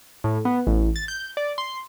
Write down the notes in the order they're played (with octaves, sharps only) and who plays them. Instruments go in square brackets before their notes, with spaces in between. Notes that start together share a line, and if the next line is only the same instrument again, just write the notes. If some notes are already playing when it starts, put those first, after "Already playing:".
[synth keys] A2
B3
A1
A6
G6
D5
C6